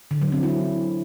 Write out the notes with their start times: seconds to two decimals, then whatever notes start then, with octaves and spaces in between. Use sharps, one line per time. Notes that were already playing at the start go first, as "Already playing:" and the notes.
0.11 D3
0.22 F#3
0.32 C4
0.43 E4